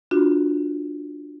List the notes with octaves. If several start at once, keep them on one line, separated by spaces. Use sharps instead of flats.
D4 F4 F#4